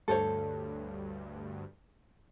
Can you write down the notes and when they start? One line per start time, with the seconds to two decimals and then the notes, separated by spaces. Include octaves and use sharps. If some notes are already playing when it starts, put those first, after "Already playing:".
0.08 D2 G2 A4 C5 C#5